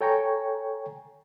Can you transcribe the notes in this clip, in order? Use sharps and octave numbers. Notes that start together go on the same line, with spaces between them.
A4 C#5 G5 G#5 A#5 C#6